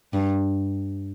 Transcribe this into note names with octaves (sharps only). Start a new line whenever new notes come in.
G2